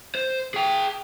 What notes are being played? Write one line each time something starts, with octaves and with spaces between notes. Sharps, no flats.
C5
G#4 G5